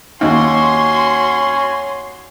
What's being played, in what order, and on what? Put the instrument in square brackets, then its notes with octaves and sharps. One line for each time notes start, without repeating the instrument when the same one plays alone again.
[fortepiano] D#2 [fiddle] F#4 [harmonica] C#5 G#5 [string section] C6